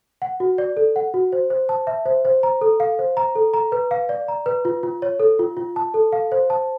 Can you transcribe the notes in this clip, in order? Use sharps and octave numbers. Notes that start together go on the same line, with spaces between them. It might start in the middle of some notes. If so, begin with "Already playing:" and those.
F#5
F#4
D5
A4
F#5
F#4
C5
C5
A5
E5
C5
C5
A#5
A4
F5
C5
A#5
A4
A#5
B4
F5
D5
A#5
B4
F4
F4
C#5
A4
F4
F4
A5
A4
F5
C5
A5